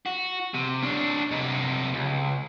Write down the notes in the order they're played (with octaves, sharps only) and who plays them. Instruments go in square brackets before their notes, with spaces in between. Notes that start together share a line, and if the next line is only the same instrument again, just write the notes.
[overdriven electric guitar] F#4
C3
D4 C#5
C3 D#4
C#2